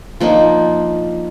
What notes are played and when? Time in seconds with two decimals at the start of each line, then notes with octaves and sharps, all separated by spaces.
0.20 F3 A#3 D4 D#4